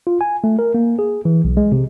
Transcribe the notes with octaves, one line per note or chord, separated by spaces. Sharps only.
F4
G#5
A3
A#4
A#3
G#4
E3
B1
G#3
C3